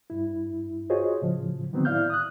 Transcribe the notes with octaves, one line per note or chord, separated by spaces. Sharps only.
G2 E4
F4 F#4 G#4 C5 C#5 D#5
A2 C#3 F3
D3 D#3 F#3 B3 C4
A2 E4 D5 F5 F6 G6
D#6 F#6